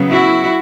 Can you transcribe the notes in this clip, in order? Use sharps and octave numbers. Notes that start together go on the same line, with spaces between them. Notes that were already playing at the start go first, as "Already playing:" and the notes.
Already playing: C#3 F#3 B3
E4 F#4